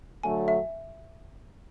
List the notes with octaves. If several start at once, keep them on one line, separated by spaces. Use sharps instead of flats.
D3 F#3 A3 G#5
E5